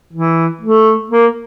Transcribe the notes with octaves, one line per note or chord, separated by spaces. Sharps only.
E3
A3
A#3